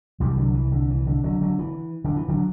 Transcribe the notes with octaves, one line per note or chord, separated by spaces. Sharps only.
C2 C3 E3 G3
D3 F#3
E3
D3
E3
D3
D3 F#3
D3 F#3
E3
D3
E3
D3 F#3